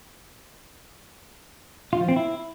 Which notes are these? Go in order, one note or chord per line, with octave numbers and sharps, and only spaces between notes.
F4
F3
C4
E4